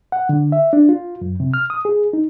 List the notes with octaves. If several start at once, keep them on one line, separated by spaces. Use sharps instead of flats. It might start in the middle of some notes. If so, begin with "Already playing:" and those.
F#5
D3
E5
D4
F4
F#2
C3
F6
D#6
G#4
D#4